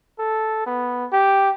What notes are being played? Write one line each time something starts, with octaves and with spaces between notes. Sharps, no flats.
A4
B3
G4